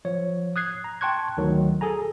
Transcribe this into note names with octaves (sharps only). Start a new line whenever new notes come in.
F3 C#5
D#6 F#6 G#6 C7
A#5
G5 A5 C6 C#6 F#6 G#6
D2 D#3 F#3
G#4 A4 G#5 A#5